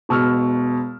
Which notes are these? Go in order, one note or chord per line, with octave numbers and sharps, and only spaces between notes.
E1 B2 C#6 E6 F6